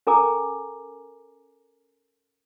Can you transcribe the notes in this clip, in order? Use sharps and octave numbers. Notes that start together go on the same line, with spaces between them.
C#4 A4 A#4 G#5 A#5 D6